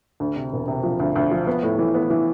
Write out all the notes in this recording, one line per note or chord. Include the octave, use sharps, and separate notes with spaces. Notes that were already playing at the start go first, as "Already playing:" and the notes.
D2
C3
E1
C3
F3
D2
D2
F3
B3
A2
E3
B3
E3